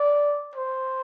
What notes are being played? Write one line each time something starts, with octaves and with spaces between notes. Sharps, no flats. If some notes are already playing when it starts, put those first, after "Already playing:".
Already playing: D5
C5